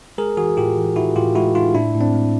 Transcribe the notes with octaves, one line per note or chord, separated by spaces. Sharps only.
G#3 G#4 A#4
E3 F#4 G#4
A2 F4 G4
E3
A2 E4 F#4
A2 F4 G4
G#3 E4 F#4
G#3 D#4 F4
A2 D4 E4
A2
C4 D4
G#3